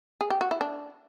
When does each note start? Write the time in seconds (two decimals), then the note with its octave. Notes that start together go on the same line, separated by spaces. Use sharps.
0.21 G#4
0.30 G4
0.41 F#4
0.51 E4
0.61 D4